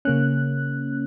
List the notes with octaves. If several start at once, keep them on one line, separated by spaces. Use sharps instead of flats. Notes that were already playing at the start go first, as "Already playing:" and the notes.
C#3 A#3 C#4 F#6